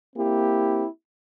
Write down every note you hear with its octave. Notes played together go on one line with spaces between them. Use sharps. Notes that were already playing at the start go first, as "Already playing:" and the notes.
A#3 C4 E4 G4